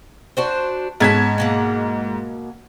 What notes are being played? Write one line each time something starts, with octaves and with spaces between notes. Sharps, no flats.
D4 F#4 C5
G#2 B3 C#4 A5 G#6 B6
B2 A#3 F#5